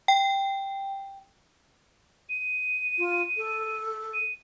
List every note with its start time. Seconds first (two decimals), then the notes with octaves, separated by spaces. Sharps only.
0.08 G5
2.29 D#7
2.98 F4
3.37 A4
4.14 D#7